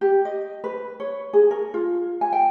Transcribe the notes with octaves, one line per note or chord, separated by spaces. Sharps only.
G4
D#5
B4
C#5
G#4
A#4
F4
G#5
G5